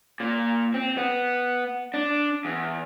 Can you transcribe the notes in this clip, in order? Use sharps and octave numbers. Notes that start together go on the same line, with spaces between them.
A#2
C4
B3
D4
E2